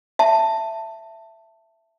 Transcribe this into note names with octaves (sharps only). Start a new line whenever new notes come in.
E5 A5